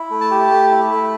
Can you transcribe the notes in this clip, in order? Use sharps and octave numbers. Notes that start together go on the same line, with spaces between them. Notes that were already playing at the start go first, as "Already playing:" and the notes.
Already playing: E4
A3
A5
G4
A3
E4
A3